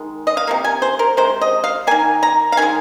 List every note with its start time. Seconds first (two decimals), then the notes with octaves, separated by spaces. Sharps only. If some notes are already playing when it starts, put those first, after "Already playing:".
Already playing: D#3 G#3
0.27 D#5
0.37 F5
0.47 C3 F3 A#3
0.64 G#5
0.82 C5
0.99 A#4
1.17 C3 G#3 C5
1.41 D#5
1.64 F5
1.87 D#3 A#3 G#5
2.23 A#5
2.52 F5
2.57 D#3 G#3 G#5